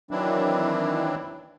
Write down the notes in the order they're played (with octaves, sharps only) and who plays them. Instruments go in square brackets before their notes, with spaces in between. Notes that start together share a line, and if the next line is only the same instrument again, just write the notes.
[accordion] D#3 E3 F#3 C4 D4 E4